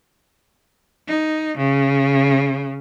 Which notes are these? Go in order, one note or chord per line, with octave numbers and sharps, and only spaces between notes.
D#4
C#3